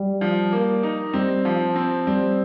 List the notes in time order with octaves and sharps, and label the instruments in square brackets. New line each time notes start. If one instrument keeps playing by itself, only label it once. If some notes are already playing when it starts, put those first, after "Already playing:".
Already playing: [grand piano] G3
[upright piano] F3
A#3
D#4
[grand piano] G3 [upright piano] C4
[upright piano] F3
C4
[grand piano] G3 [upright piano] C4